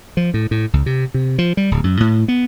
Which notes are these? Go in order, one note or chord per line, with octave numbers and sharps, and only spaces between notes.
F3
A2
A2
C#2
C3
C3
F3
G3
D1
F#2
A2
B3